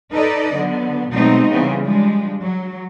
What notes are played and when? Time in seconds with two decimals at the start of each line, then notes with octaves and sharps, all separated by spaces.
0.13 D#4 A4 B4 D5 D#5
0.56 D3 F#3 B3
1.13 B2 F#3 G#3 A3 C4 D#4
1.49 C#3 E3 G3 B3 C4
1.84 F3 G3 G#3 D4
2.43 F#3